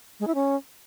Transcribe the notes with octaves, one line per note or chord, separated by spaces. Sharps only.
G#3
E4
C#4